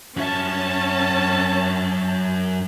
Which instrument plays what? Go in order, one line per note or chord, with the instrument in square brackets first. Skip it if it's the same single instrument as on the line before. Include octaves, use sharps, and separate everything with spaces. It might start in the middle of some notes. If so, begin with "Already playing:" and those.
[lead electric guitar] F#2 E5 [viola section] C#4 A5